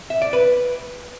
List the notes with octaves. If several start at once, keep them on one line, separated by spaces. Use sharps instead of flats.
E5
D5
B4